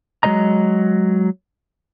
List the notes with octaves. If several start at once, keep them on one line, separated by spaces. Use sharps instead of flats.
F#3 G#3 C5 D#5 A#5